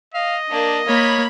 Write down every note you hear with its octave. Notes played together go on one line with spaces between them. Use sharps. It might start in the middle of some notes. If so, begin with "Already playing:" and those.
D#5 F5
A#3 D4
A#3 C#5 B5